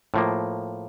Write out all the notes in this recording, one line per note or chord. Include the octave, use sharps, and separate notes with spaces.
A2 F3 A#3